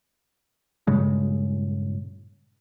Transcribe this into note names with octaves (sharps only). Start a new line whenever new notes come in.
G2 A#2 C#3 G#3